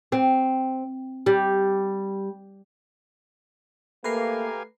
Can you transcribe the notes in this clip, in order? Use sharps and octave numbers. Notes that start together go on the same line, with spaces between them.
C4
G3
A3 A#3 G4 B4 F5 G#5 A#5 C7